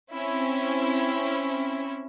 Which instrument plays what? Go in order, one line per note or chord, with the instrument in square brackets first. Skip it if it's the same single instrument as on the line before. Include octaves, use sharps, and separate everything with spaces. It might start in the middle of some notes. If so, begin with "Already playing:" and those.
[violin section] C4 C#4 E4